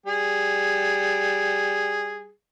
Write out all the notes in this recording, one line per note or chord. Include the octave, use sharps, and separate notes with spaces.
G3 G#4